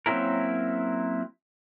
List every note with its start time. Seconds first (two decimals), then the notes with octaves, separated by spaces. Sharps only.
0.06 F#3 A#3 C4 C#4 E4 A#4